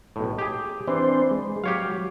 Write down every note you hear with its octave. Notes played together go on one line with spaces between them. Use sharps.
B1 A2
G4 G#4
E3 C4 D4 C5
G#3
F#3 G4 C#5 F5